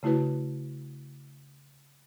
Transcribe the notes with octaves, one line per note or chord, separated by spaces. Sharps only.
C#3 A3 E4 F#4 B4